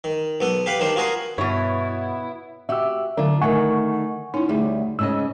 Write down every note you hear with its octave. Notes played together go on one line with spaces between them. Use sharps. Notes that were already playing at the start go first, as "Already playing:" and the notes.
D#3
B1 B3 A4
G4 B4 F5 G5 B5
D#3 G3 D4 C5
F4 F#4 G#4 A#4 G#5 C6
G2 B2 B3 E4 C#5
F#4 G4 E5 E6
D3 F#3 D4 F4
D#3 A3 F#5 G#5 C#6
C#4 D#4 E4
D2 G3 G#4
G#2 C#3 D#5 E6